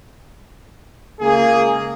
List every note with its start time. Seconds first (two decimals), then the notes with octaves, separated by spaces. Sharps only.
1.20 C#2 A#3 G#4